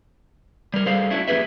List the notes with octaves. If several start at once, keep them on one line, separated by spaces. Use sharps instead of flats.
G3 A#4
G3 G#4 A4 C5 F5
A3 C#4 D4 E4 F#4
F3 A#3 G4 G#4 B4 E5